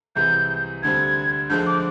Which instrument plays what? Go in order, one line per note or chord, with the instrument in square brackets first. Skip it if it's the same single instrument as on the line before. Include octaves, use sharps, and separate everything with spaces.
[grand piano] C2 C3 E3 G#3 [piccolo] G6
[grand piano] D2 D3 G3 C4 [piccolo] G#6
[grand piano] D2 D3 F3 G#3 [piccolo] G6
[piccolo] D6